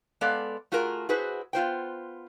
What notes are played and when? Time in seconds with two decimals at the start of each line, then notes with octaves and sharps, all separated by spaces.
0.21 G#3 B3 A4 D5 F5
0.72 A3 F4 F#4 G#4 A#4
1.09 E4 F#4 G#4 B4 C5
1.53 B3 F4 C5 G5